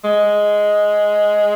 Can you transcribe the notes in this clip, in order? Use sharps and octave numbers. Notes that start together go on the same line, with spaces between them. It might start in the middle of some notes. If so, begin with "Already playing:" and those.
G#3